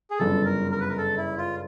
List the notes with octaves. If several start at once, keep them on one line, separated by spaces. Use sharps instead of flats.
G#4
G1 F#2 C#3 E3 A4
A#4
A#4
B4
A#4
A4
E4
F4